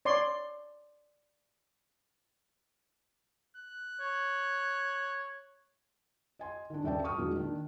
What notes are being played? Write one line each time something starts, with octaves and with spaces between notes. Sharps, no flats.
C#5 D5 C6
F#6
C#5
D#5 G#5 C6
D#3 D4
D#1 C#3 D5 E5 G5 A5
C#6 D#6 F6
E2 A#2 F#3 G#3 D4
D#3 D4